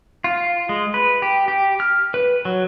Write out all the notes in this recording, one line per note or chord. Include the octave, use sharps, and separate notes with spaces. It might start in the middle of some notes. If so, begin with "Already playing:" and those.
F4
G#3
B4
G4
G4
F6
B4
F#3